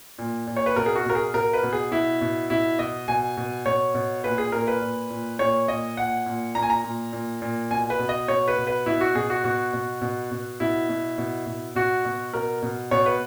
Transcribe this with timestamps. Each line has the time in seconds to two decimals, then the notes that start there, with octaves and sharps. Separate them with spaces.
0.18 A#2
0.47 A#2
0.56 C#5
0.66 B4
0.76 B2 A#4
0.86 G#4
0.95 F#4
1.05 B2 A#4
1.15 G#4
1.34 B2 A#4
1.53 B4
1.63 B2
1.73 G#4
1.91 B2 E4
2.21 B2
2.50 B2 E4
2.79 B2 D#5
3.08 B2 G#5
3.37 B2
3.66 B2 C#5
3.94 B2
4.24 A#2 B4
4.38 G#4
4.52 A#2 A#4
4.67 B4
4.82 A#2
5.10 A#2
5.39 A#2 C#5
5.68 A#2 D#5
5.97 A#2 F#5
6.26 A#2
6.55 A#2 A#5
6.62 G#5
6.70 A#5
6.84 A#2
7.13 A#2
7.42 A#2
7.71 B2 G#5
7.90 B4
7.99 B2
8.09 D#5
8.28 B2 C#5
8.48 B4
8.58 B2
8.67 B4
8.86 B2 E4
9.01 F#4
9.15 B2 G#4
9.30 F#4
9.44 B2 F#4
9.73 B2
10.02 B2
10.31 B2
10.60 B2 E4
10.89 B2
11.18 B2
11.46 B2
11.75 B2 F#4
12.05 B2
12.34 B2 A#4
12.62 B2
12.91 B2 C#5
13.06 B4